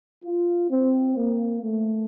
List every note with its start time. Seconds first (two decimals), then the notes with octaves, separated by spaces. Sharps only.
0.25 F4
0.70 C4
1.17 A#3
1.62 A3